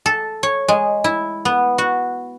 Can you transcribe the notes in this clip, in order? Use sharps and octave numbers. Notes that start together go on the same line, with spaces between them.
A4
C#5
G#3
E4
B3
F#4